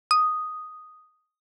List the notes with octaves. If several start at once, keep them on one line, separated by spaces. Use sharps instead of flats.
D#6